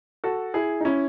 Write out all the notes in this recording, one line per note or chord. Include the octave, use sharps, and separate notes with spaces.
F#4 A4
E4 G#4
D#4
C#4 E4